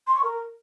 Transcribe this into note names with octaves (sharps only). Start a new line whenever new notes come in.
C6
C#6
A#4